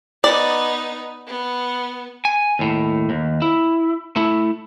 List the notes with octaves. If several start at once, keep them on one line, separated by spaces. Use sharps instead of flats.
B3 D#4 D5
B3
G#5
D#2 A2
D#2
E4
A3 E4